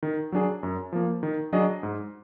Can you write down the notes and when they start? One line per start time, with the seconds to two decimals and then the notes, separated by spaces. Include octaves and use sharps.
0.03 D#3
0.32 F#3 D4 G#4
0.63 F#2
0.93 F3 A#3
1.23 D#3
1.53 F#3 D4 G#4 D#5
1.83 G#2